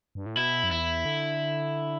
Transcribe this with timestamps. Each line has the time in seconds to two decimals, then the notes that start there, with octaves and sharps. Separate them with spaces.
0.15 G2
0.26 A2
0.37 B2 E4
0.64 F#2
0.71 E2 E4
1.05 D3